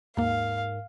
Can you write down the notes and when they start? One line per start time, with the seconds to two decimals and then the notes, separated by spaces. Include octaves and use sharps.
0.17 D#2 G#2 A#3 A#4 F5